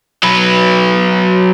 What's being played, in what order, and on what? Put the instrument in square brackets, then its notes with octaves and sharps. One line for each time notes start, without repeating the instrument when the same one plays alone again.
[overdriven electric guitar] F#3 B4